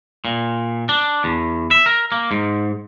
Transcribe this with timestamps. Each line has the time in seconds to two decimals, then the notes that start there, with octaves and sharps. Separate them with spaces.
0.25 A#2
0.89 D4
1.24 E2
1.71 E5
1.86 A#4
2.12 A#3
2.31 G#2